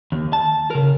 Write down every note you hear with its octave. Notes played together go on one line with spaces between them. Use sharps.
D#2
A5
C#3 A#4